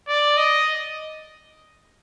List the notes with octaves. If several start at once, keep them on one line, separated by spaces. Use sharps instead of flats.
D5
D#5